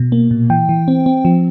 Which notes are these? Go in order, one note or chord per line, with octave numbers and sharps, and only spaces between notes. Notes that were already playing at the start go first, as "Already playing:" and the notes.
Already playing: B2
A#3
A#2
E3 G5
E3
C4
C4
F3